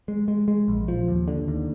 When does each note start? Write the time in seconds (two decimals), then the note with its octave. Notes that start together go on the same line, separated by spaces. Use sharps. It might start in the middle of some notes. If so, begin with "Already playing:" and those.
0.08 G#3
0.28 G#3
0.48 G#3
0.68 A#1
0.88 F3
1.08 D#2
1.28 D3
1.48 D#2